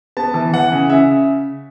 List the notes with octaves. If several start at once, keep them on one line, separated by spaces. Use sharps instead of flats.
B3 A5
E3
E3 F#5
C#3
C#3 E5